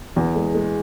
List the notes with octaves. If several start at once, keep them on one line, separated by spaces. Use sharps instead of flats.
E2
G#3
G#3